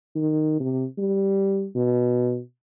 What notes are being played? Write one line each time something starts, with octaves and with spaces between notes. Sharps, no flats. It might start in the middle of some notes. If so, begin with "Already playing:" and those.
D#3
C3
G3
B2